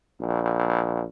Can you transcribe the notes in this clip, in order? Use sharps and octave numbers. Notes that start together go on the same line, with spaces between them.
A#1